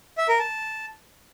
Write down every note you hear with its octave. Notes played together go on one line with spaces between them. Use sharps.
E5
A#4
A5